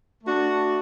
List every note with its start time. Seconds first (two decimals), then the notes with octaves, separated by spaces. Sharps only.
0.24 A3 D4 F#4